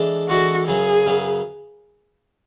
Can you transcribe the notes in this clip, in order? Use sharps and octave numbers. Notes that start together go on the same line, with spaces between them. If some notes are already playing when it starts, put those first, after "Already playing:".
Already playing: E3 G#3 D4 A4
E3 G#3 D4 F#4 A4
F#2 C#3 F#3 B3 G#4
F#2 C#3 F#3 B3